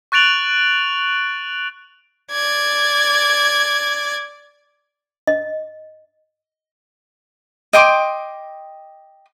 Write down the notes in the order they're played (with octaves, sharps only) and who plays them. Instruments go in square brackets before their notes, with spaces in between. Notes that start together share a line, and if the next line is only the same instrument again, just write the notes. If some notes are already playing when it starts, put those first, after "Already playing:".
[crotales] C#6 F#6 A6 D7 F7 F#7
[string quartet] D5 G#6
[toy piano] D#5
[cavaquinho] D#5 G5 C6 D6